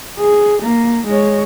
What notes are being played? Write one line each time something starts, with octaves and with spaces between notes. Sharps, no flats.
G#4
A#3
G#3 C#5